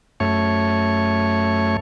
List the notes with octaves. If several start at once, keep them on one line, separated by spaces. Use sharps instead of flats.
F#2 A3 C#5